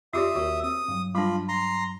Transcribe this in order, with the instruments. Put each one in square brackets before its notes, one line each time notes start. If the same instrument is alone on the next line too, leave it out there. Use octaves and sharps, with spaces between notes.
[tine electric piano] F2 C6 [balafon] F4 G4 D5 [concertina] E5 D#6
[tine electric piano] D#2 A#4 [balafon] F#4
[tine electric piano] C4 [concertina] D#6
[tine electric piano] G2 F#3
[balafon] G3 D4 [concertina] F4 B5
[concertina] A#5 C6